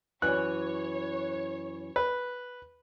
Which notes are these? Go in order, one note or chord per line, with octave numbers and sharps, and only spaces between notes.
F#2 E3 C#5 F#6
B4